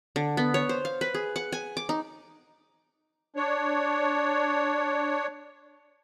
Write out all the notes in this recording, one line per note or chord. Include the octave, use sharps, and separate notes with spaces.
D3
B3
C#5
C5
F5
B4
G#4
F#5
G#5
D6
D#4
D4 C#5